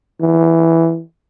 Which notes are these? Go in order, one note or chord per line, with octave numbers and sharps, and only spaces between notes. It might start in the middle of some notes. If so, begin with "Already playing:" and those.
E3